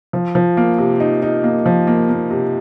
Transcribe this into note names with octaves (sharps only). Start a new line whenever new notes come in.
F3
F3
A#3
C3
D#4
D#4
A#3
F3
A#3
A#3
C3